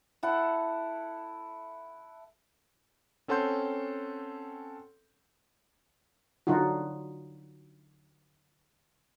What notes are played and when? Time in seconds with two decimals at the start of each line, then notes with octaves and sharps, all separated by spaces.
0.23 E4 A4 F#5
3.28 C4 C#4 A4 F#5 C6 G6
6.47 D3 F#3 D#4 F4 F#4